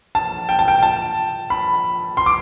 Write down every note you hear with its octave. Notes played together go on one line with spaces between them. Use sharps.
A5
G5
A5
G5
A5
B5
C6
D6